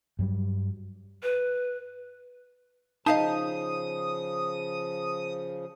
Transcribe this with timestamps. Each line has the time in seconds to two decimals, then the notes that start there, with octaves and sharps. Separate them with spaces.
0.19 G2 F#3 G3
1.23 B4
3.06 C#3 F3 D#4 D#5 F5 A5 D#6